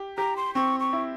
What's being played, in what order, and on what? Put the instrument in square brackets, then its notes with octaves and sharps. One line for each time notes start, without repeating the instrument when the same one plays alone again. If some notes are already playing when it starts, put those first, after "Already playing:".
Already playing: [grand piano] G4
[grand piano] G4 [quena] A#5
[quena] C6
[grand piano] C4 [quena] C#6
[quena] C#6
[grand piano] E4